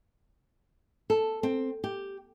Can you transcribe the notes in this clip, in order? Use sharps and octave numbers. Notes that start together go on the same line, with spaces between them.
A4
C4
G4